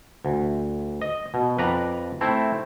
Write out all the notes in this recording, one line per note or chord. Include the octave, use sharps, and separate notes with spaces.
D2
D#5
B2
F2 B4 D5 A#5
A3 C4 E4